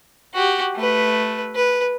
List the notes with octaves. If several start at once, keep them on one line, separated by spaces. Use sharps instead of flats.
F#4 G4
A3 B4
B4